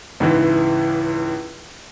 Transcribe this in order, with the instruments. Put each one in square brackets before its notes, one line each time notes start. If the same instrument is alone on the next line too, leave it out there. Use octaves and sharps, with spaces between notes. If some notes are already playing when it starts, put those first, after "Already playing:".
[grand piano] C#2 G#2 E3